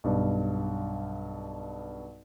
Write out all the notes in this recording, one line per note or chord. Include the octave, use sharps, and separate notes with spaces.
B1 G2